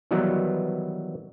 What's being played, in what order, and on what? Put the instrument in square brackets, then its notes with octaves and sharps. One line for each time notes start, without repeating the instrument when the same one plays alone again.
[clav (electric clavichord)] D#3 E3 F#3 G3 B3 D#4